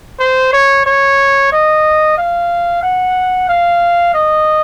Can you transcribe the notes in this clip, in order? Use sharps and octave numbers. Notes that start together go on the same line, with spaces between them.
C5
C#5
C#5
D#5
F5
F#5
F5
D#5